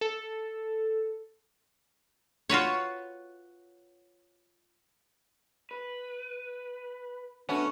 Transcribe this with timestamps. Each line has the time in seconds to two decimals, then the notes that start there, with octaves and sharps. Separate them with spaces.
0.01 A4
2.49 F4 F#4 B4 C#5
5.71 B4
7.49 A3 B3 C#4 D4 F#4